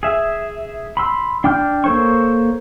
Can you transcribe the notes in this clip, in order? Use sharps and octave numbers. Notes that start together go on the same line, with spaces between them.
G#4 E5
B5 C6 E6
D4 G5 D6 F6 G6
A#3 A4 C5 C#5 C#6